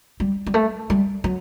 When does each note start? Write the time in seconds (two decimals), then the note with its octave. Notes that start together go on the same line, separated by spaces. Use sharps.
0.20 G3
0.46 G3
0.54 A3
0.90 G3
1.24 F#3